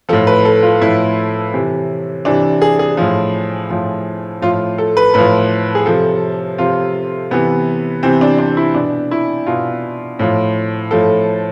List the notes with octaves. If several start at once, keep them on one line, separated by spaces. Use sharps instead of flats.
A2 F3 A4
B4
A4
F4
A2 F3 E4
C3 E3
C3 E3 D4
G#4
G#4
A2 F3
A2 F3
A2 F3 F4
A4
B4
A2 F3 B4
G#4
C3 F3 A4
C3 F3 F4
C3 E3 B3
C3 E3 C4
D4
D4
E4
B2 D4
E4
B2 F4
A2 F3
A2 F3 A4